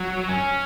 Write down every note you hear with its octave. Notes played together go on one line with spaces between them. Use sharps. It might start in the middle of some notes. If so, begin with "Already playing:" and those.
Already playing: F#3
C#4